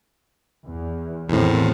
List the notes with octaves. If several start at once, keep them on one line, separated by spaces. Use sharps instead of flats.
E2
A1 E2 A2 D#3 C4